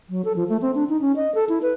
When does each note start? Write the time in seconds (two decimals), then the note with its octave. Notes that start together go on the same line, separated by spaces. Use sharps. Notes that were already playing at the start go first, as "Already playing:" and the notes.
0.10 F#3
0.25 A4
0.36 F3
0.49 A3
0.62 C4
0.75 D4
0.89 D#4
1.01 C#4
1.16 D#5
1.35 A4
1.49 E4
1.62 B4